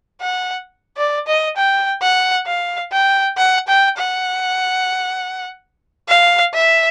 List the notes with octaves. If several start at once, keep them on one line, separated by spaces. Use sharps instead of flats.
F#5
D5
D#5
G5
F#5
F5
G5
F#5
G5
F#5
F5
E5